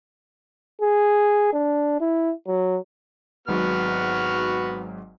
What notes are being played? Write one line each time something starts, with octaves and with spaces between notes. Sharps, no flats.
G#4
D4
E4
F#3
G#1 G#2 F#3 B3 F#4 F6